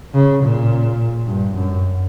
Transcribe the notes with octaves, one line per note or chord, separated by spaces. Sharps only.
C#3
A#2
G2
F#2